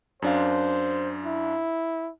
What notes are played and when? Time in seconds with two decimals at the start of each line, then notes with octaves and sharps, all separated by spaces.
0.22 F#2 D4 C5 F5
1.26 E4